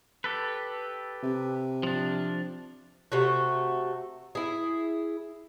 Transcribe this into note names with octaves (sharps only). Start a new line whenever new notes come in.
G4 A4 B4
C3
F3 D4
C3 A3 F#4
E4 G#4